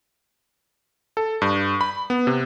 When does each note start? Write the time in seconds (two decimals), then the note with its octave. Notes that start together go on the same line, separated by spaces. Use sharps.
1.17 A4
1.42 G2
1.81 B5
2.10 B3
2.27 C3